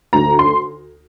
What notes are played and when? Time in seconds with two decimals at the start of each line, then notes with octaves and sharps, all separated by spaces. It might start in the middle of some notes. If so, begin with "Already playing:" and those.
0.13 D2 D3 A3 A#5
0.39 C6